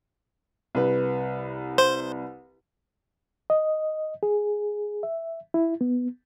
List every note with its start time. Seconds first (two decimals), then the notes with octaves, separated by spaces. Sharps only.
0.75 C2 B4
1.78 C5
3.50 D#5
4.23 G#4
5.03 E5
5.54 E4
5.81 B3